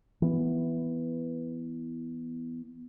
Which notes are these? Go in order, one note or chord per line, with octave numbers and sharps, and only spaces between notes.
E3 B3